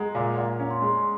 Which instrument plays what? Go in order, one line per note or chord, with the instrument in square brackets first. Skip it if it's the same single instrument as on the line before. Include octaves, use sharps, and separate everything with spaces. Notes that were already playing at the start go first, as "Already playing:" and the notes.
Already playing: [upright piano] G#3 [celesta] F#5 A#5
[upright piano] A#2 [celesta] G#5
[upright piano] A#2 [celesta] F#5
[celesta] A#5
[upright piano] C#4
[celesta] C6
[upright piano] G#3
[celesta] C6